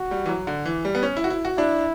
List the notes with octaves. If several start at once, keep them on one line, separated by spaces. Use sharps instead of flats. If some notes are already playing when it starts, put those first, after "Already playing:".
Already playing: F#4
G3
E3
F#3
D3
E3
G3
B3
C#4
E4
F#4
E4
F#4
D4 E4